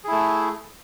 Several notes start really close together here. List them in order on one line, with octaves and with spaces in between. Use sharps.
G#4 E4 A3